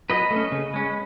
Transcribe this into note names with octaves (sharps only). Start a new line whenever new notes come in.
F#3 B4 D#5
A3
C#4
C#3
G#3 C#4